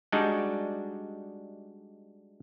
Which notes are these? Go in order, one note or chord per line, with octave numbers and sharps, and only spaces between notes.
G3 G#3 D4 D#4 F#4